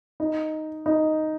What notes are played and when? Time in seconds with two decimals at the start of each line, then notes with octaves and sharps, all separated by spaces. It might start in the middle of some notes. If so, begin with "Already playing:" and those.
0.20 D#4
0.86 D#4